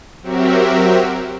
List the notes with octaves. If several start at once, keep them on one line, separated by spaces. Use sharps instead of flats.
F#3 C4 F#4 G4 A#4 E5